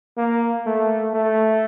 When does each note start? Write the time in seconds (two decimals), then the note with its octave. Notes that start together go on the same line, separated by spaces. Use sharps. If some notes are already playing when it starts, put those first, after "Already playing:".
0.17 A#3
0.66 A3
1.14 A3